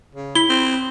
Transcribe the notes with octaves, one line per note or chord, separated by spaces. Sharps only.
C#3
E4 B6 G7
C4